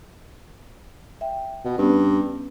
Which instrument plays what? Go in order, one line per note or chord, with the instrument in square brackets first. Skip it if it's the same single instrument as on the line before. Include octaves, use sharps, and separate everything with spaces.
[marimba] E5 G5
[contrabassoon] B2
[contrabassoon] G2 [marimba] B3 C#4 B4